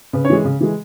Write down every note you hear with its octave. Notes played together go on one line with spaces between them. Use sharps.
C#3 B4
C#4 C#5
E3 G#3
C#3
E3 G#3